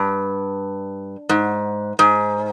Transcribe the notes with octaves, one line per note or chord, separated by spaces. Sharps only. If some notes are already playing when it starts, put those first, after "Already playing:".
Already playing: G2
G#2
G#2